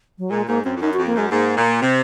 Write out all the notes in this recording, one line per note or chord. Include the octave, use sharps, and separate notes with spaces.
F#3
A#2 G#3
G#2 A#3
F#2 C4
F2
F#2 D#4
F#4
F2
A#3
F#2 G#3
G#2 A#3
A#2
C3 C4